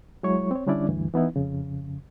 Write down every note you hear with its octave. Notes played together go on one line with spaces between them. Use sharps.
F#3 G#3 E4 C#5 C#6
C4 C#5
D3 G3 C#4 D4 E4 D5
D2 G2 E3
E3 B3 D#4 E4
F2 C#3